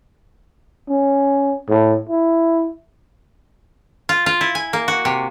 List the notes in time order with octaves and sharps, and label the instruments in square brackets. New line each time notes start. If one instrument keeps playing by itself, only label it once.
[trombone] C#4
A2
E4
[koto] F4
F4
E4
G#5
A#3
F#4
C3